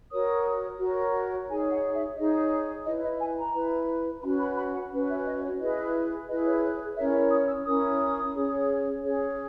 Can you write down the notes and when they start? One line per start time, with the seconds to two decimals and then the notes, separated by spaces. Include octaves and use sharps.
0.11 F#4 A#4 C#5 D#6
0.80 F#4 A#4 C#5
1.48 D#4 G#4 C#5 G#5
1.71 F#5
1.94 E5
2.16 D#4 G#4 C#5 D#5
2.86 E4 B4 D#5
3.02 D#5
3.20 G#5
3.38 A#5
3.54 E4 B4
4.23 C#4 F#4 B4 B5
4.40 B5
4.57 B5
4.74 F#5
4.92 C#4 F#4 B4
5.08 E5
5.25 D#5
5.43 C#5
5.60 E4 G#4 B4 D#5
6.28 E4 G#4 B4 D#5
6.45 C#5
6.63 C#5
6.97 C#4 E4 A#4 C#5 E5
7.31 D#6
7.48 E6
7.65 C#4 E4 A#4 C#5 D#6
8.34 C#4 G#4 C#5
9.02 C#4 G#4 C#5